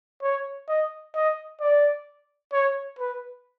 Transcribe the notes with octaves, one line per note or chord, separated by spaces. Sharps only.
C#5
D#5
D#5
D5
C#5
B4